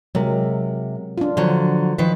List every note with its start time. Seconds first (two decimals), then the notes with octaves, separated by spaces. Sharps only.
0.15 C3 F#3 G#3 A#4
1.18 D4 F4
1.37 D3 F3 F#3
1.98 D#3 F3 B4